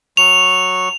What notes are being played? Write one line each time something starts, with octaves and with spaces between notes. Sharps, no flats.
F#3 C#6 F7